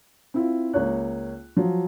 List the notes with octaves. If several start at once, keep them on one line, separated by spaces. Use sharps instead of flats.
C4 E4 F4
C#2 A#3 C#5 F#6
F3 F#3